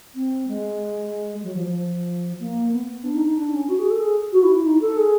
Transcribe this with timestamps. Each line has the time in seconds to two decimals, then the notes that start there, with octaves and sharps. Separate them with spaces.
0.15 C4
0.47 G#3
1.43 F#3
1.54 F3
1.64 F3
2.39 A#3
2.71 B3
3.03 D4
3.14 D#4
3.24 D#4
3.35 D4
3.47 D4
3.51 C#4
3.68 F#4
3.78 G#4
3.90 A4
3.99 G#4
4.32 F#4
4.42 E4
4.53 E4
4.64 D#4
4.80 A4
4.96 G#4